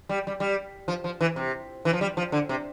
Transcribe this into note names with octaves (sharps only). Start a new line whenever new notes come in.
G3
G3
G3
F3
F3
E3
C3
E3
F3
G3
F3
D3
C3